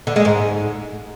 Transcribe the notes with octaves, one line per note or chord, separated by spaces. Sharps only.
D3
G#3
G#2